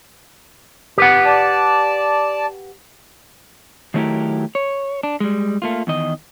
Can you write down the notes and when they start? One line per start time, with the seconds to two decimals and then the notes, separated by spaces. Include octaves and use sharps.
0.98 G4 B4 F#5
1.26 D5 A5
3.94 D#3 F#3 A3 E4 G4 A#4
4.55 C#5
5.03 D4
5.20 G3 G#3
5.62 A3 A#3 F4
5.87 E2 D#3 D#5